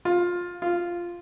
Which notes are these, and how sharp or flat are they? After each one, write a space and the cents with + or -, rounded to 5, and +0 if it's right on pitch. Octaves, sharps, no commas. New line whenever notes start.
F4 +15
F4 -5